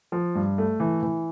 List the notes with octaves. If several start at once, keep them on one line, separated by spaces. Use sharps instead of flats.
F3
G2
A3
E3
E3